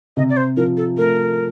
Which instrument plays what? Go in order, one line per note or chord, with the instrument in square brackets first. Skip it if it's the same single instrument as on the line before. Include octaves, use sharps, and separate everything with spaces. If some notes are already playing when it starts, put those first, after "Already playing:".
[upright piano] C3 [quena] D#5
[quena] D5
C5
[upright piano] F3 [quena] A#4
[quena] A4
[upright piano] A3 [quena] A#4